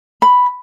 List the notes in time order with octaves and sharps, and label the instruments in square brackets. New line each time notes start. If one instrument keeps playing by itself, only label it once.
[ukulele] B5